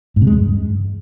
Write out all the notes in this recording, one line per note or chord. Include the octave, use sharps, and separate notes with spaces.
G#2
C3
G#3
E2
G2